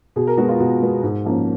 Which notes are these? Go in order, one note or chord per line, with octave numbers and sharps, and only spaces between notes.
B2 G#4
A#4
G#3 B3 F#4
F4
B2 F#4
G#3 B3
G#2
F3 A#3 C#4